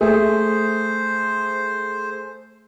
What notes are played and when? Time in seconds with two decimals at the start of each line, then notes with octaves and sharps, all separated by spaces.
0.01 A3 G#4 C5